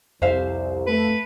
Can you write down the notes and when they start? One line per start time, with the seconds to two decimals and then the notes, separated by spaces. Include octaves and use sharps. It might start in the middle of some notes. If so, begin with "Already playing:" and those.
0.22 C2 F2 C5 E5 F5
0.87 A3 A4 B4